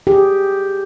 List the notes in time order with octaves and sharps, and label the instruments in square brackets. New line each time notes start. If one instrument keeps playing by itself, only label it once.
[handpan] G4 G#4